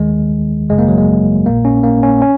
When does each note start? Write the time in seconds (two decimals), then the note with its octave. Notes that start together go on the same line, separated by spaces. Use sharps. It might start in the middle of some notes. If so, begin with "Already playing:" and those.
Already playing: D#2 D#3 G#3
0.69 G#1 F#2 C#3 G#3
0.79 A#3
0.88 F#3
0.98 G#3
1.45 A#1 A#2 A#3
1.65 C#4
1.84 A#3
2.03 C#4
2.22 C#4